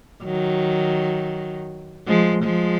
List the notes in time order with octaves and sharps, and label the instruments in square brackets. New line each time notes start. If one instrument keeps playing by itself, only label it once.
[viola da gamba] D#3 F#3
F3 G#3
F3 G#3